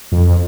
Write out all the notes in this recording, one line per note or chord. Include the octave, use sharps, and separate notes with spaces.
F2